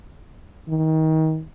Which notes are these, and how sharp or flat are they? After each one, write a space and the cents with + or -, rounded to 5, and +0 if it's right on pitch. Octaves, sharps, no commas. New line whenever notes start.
D#3 +30